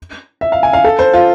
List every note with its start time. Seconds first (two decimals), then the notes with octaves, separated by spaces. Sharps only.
0.41 E5
0.52 F5
0.63 G#5
0.73 F5
0.84 A4
0.99 C5
1.14 F4